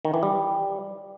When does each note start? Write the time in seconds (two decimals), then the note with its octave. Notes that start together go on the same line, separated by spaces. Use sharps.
0.05 D#3
0.14 E3
0.23 G3